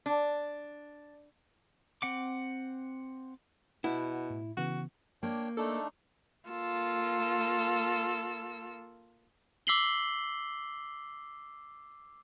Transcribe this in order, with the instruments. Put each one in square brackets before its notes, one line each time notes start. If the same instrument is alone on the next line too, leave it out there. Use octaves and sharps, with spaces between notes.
[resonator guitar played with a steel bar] D4
[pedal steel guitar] C4 F#5 D6
[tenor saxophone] B2 [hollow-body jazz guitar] E4 [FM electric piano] F#5
[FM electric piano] A2
[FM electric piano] C#3 E3 B3 [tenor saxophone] F#4
[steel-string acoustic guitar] A#3 [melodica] D4 C#5 G5
[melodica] A3 D4 D#4 [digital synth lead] A4
[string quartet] A#3 F4 A4 E6
[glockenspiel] D6 E6 B6 C7 F#7 G7